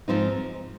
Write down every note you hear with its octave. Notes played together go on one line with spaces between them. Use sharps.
G#2 F3 C4 D#4